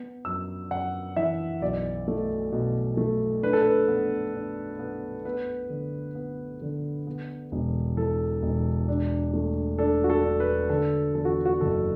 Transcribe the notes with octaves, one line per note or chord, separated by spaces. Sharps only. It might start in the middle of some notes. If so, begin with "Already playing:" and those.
Already playing: B3
F#2 E6
F#2 F#5
E3 E5
B1 D5
A3
B2
A3
D4 B4
A4
B4
B3
D4
B3
B3 B4
D3
B3
D3
B3
E1
E3 A4
E1
D4
A3
D4 A4
F#4
A4
D4
B4
D3 A4
E2 A4
F#4
F#4
F#1 A4